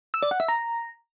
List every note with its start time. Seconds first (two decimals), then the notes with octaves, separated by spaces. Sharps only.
0.14 E6
0.23 D5
0.31 F#5
0.40 E5
0.48 A#5